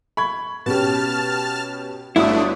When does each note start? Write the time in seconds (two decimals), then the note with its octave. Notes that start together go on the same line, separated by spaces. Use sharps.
0.17 B5 C#6 G#6
0.66 B2 B3 C#4 G4 A5 F6
2.16 G1 A3 D4 E4 F#4 D#6